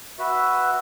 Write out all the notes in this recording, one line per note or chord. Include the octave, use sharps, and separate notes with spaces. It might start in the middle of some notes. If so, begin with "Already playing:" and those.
F#4 B4 E5